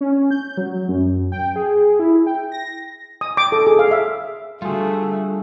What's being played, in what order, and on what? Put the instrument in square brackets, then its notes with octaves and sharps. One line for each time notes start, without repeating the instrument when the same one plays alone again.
[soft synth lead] C#4
G6
F#3
F#2
G5
G#4
E4
G5
A#6
[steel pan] D#6
D6
A4
G#4
F5
E5
[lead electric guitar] D3 G3 [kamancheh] A3 [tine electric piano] F4 G#4 [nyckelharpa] F#4